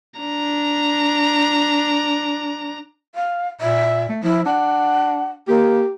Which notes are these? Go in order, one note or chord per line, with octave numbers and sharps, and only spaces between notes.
D4 A#5
F5
A#2 E5
A3
F3 E4
D4 F#5
A#3 G4